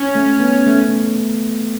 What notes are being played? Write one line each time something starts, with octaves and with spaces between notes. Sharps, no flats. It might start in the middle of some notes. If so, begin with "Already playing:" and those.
Already playing: C#4
A3
B3
A3